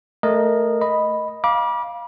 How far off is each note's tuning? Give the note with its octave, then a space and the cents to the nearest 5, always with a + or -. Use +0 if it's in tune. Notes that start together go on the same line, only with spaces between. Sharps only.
A3 +0 A#4 +10 D#5 -15
D#5 +0 B5 +0
F5 +0 B5 -40 D6 +0